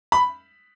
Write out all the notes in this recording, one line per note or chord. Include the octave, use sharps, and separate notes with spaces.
B5